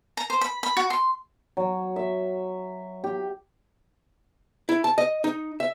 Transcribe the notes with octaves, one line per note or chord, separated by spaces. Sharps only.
A#5
C5
B5
B5
F#4
C6
F#3
E5
G4
E4
A5
D#5
D#4
E5